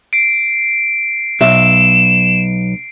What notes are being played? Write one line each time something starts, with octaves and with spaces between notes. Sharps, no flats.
C7 D7
B1 E5 E7